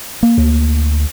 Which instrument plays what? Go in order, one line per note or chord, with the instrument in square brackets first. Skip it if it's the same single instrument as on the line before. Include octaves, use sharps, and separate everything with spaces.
[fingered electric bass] A#3
[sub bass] D2